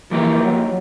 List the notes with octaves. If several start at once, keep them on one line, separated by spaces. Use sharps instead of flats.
E3 F3 A#3 D#4 G4 A#4
F#3